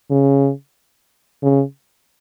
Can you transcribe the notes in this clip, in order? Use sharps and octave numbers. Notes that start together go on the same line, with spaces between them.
C#3
C#3